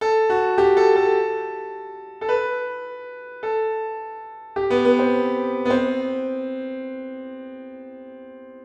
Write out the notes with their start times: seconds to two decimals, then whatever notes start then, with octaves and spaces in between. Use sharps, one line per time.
0.01 A4
0.30 F#4
0.58 G4
0.77 A4
0.96 A4
2.21 A4
2.29 B4
3.43 A4
4.56 G4
4.70 B3
4.85 B3
4.99 C4
5.66 B3
5.70 C4